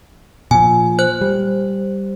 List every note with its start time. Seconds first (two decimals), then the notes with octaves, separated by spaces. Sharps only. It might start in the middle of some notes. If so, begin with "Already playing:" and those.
0.51 A#2 F3 G#5
0.99 C5 F#6
1.21 G3